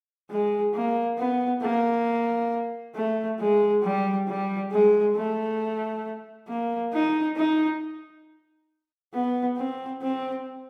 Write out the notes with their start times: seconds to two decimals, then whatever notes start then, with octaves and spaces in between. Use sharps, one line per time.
0.30 G#3
0.74 A#3
1.18 B3
1.62 A#3
2.95 A3
3.39 G#3
3.83 G3
4.28 G3
4.72 G#3
5.15 A3
6.48 A#3
6.93 D#4
7.37 D#4
9.14 B3
9.57 C4
10.02 C4